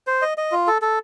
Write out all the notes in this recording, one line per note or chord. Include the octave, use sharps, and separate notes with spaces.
C5
D#5
D#5
F4
A4
A4